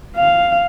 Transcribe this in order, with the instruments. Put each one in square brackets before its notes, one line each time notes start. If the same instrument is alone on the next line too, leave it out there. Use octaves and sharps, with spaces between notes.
[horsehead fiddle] F5